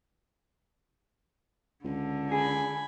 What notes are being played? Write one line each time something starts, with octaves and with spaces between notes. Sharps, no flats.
C#2 D3
G#4 G#5 B5